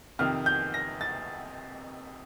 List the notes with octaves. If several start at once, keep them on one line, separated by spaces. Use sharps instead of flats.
F2 C3 D#3 F6
G6
A#6
A6